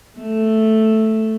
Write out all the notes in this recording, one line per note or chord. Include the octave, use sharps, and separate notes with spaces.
A3